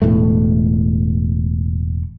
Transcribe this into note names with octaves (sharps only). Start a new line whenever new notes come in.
E1 A2 A3